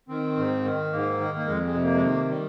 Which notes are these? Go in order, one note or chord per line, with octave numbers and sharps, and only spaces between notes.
D#3 C4
G#2
D#3
G#2 A#3
D#3
A#3
F2 G#3
G#3
C3
A#3
G#3
D#3 A#3
G3